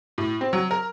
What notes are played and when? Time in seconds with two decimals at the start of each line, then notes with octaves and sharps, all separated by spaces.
0.18 A2
0.41 C4
0.53 F#3
0.71 A#4